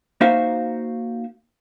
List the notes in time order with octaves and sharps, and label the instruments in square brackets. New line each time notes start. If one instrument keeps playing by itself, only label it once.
[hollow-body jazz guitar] A#3 D#4 F#4 C5 E5 F5